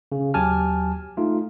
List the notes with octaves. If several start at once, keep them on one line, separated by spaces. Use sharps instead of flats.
C#3
D#2 F#3 G4 G#5 A5 F6
A3 D#4 F4